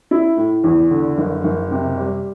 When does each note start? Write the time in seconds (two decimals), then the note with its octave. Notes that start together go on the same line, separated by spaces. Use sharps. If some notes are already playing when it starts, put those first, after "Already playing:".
0.11 E4
0.37 A2
0.64 E2
0.91 D3
1.18 F#1
1.44 F#1
1.71 C3
1.98 G3